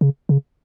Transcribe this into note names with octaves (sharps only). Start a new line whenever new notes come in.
C#3
C#3